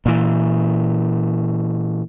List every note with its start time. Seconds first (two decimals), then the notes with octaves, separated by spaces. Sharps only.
0.06 A#2 E3